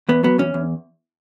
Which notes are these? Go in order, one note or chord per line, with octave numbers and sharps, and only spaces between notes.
E2 B3
F#3 B3
E2 C#4
E2